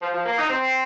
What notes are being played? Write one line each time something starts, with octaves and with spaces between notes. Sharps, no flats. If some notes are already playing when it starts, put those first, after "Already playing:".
F3
F3
A#3
D#4
C4